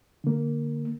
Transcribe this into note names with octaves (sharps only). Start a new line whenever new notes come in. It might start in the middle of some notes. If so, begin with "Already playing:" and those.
D3 A#3